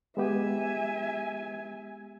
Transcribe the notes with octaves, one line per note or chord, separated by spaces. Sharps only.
G#3 B3 G4 E5 G#5